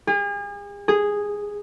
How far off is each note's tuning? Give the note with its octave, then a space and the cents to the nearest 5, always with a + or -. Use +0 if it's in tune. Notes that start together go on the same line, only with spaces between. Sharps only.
G#4 -40
G#4 -10